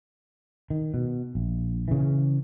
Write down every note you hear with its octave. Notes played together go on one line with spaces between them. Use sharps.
D#3
B2
A#1
C#3 E3